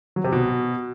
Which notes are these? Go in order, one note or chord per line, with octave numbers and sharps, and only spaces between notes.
F#3
C3
B2